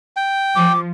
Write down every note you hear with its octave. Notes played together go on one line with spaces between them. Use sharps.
G5
F3 D6